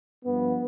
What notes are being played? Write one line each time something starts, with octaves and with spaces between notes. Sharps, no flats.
G2 F3 B3